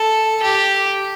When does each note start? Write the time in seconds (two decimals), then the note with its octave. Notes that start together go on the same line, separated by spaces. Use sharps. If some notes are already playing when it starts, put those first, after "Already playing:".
Already playing: A4
0.42 G4